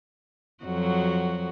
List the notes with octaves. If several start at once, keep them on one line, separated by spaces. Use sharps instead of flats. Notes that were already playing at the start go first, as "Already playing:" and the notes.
F2 F#3 F#4